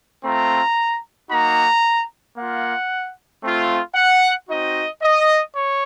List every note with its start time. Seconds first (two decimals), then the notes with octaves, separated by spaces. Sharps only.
0.23 A3 C4 F4 A#5
1.30 A#3 D#4 F#4 A#5
2.36 A#3 F4 F#5
3.43 A3 C4 F4
3.95 F#5
4.48 C4 D#4 F#4 D#5
5.02 D#5
5.55 C#5